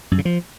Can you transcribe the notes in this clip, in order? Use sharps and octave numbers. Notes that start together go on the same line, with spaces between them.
F#2
C#3
F3